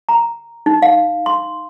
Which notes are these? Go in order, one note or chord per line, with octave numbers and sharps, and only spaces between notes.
A#5
D#4
F5
C6